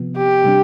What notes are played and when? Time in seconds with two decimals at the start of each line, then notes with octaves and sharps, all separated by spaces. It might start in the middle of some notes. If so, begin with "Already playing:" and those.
Already playing: C3 F3 B3
0.17 G4
0.44 C3 G3 D4